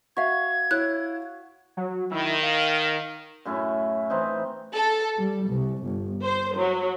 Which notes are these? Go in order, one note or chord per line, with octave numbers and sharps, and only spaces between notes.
F#4 E5 F5 C#6 G#6
E4 C#5 F#6
F#3
D#3 E4
F5
F#2 A2 C#4 E4
E3 C4 D#4
A4
G3
C2
G1
C5
F#3